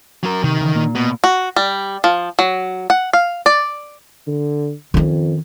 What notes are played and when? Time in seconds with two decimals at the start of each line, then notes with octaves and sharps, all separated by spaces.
0.23 F#3 A#4
0.44 C3 D#3
0.61 C#3 E3
0.75 A#2 A#3
0.95 B2
1.24 F#4
1.56 G3
2.04 F3
2.39 F#3
2.90 F#5
3.13 F5
3.46 D5
4.27 D3
4.94 F2 D#3 C#4